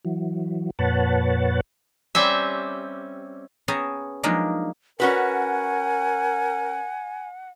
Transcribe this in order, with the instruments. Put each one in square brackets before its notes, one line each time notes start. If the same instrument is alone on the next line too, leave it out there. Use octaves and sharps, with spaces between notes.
[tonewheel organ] E3 F#3
F2 A#2 B4 C#5 F#5 A5
[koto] G3 C4 C#4 E5
[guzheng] B3 C#4 G#4 G5 A5 A#5
F3 F#3 G#3 A#3 D4 D#4
[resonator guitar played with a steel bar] C#4 F#4 B4 [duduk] A#4 [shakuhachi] F#5 [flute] G#5